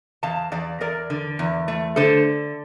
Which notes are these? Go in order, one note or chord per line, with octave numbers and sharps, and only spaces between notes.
E2 F5 A5
E2 D5 F5
E2 A#4 D5
D3
E2
A3
D3 A4 C5